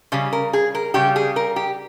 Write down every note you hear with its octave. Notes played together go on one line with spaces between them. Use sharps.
C#3 G3 C#4
A#4
G#4
A#4
C#3 G3 G4
G#4
A#4
G4